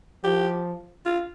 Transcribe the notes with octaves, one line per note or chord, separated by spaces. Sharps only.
F3 G4
F4